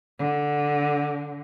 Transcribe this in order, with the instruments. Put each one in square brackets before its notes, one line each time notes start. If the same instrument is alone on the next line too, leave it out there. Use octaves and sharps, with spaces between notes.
[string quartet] D3